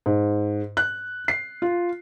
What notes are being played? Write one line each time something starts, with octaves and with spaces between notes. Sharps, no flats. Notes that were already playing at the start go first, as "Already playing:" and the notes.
G#2
F#6
C7
F4